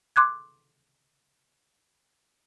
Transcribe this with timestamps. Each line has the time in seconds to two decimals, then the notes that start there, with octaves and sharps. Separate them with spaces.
0.16 C6 D6 F#6 G#6